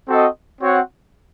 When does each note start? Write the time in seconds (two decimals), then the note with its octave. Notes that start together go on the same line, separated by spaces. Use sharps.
0.08 C4 F#4 A4 D#5
0.61 C4 F#4 C#5 F#5